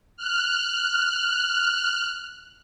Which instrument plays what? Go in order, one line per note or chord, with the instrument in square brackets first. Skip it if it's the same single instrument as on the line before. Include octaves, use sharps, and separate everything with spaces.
[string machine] F6 F#6